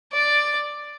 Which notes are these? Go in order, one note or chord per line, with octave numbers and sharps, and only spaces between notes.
D5